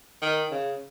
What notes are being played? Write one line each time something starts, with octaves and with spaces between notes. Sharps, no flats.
D#3
C#3